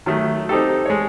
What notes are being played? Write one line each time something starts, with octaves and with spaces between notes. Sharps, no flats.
D#3 F#3 A3
C4 D#4 G4 A4
G#3 C#5